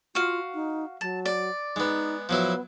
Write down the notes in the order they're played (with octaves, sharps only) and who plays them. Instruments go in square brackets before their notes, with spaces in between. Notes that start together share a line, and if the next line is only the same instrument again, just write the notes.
[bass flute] F4 [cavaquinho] F#4 F5
[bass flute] D#4
[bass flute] F#3 [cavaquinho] A5
[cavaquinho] D5
[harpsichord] G#3 B3 [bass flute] D#4
[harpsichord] F3 F#3 E4 [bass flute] B3